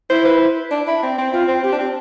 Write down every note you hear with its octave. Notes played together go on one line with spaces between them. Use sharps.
E4 C5
B4
D4
E4
C4
C4
C4 F4
C4
C4 G4
D4
C4